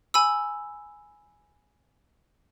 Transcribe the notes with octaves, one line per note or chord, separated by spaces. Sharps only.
G#5 B5 E6